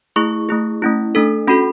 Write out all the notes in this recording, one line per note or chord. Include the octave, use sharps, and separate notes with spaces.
A3 E4 G#4 C#6
A3 E4 G#4
A3 C#4 E4
A3 D4 A4
C#4 F#4 A4 B5